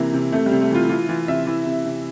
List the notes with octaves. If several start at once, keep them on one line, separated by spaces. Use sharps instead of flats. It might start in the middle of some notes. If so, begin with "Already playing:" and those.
Already playing: C3 E3 A#3
C3
C3 A3
G3
C3
A3
E3 F4
E3 F4
E3 F4
C3 E5
E3
C3
C3